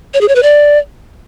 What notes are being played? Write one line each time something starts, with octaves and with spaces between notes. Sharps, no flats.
C#5
G#4
C#5
B4
D5